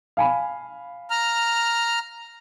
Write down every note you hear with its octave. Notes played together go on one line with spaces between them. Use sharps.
F5 G#5 B5
A#5 F6